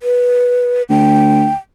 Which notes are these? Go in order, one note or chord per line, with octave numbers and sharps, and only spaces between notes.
B4
D2 G5